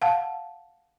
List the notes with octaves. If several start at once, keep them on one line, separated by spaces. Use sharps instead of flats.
F5 F#5 A5